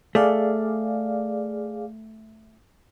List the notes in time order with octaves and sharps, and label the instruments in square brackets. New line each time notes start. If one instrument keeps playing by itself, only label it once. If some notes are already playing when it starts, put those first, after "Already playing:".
[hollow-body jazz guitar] A3 [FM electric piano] G#4 D5 F5